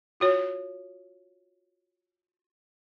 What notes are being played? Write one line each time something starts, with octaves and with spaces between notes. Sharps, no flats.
F4 F#4 C#5